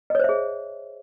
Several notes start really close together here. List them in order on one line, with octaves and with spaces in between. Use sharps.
D#5 C#5 C5 E5 G#4